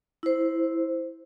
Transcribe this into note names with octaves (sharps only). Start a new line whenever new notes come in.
E4 C5